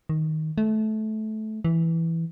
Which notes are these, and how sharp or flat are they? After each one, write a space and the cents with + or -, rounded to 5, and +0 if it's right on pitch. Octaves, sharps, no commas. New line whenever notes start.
D#3 +10
A3 -20
E3 +0